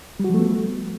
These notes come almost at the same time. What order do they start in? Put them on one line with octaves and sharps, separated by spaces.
G3 F#4 F3 A3 B3